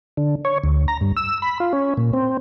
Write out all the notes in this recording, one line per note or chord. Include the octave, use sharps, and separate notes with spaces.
D3
C#5
D2
A#5
G2
E6
B5
F4
C#4
A#2
C4